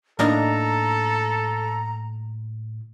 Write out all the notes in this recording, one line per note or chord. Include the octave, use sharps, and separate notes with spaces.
A2 A#3 D4 D#4 A4 A#5